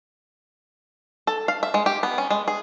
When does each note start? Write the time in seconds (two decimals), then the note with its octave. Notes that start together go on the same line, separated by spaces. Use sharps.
1.27 A4
1.48 F5
1.63 E5
1.74 G#3
1.86 G4
2.03 B3
2.18 C#4
2.31 G#3
2.48 G#4